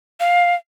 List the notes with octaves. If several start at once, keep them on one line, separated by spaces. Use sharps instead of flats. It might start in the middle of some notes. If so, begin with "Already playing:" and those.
F5